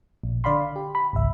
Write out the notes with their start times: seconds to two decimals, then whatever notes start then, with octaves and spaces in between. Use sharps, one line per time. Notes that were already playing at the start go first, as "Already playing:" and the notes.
0.23 A#1
0.44 D3 D5 F5 B5 C6
0.76 G4
0.95 B5
1.13 G#1 C#2 E5